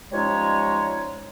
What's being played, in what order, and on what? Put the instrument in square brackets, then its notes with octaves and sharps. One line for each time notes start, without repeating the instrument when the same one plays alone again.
[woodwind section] F3 G3 G#3 C#4 D#4 C#5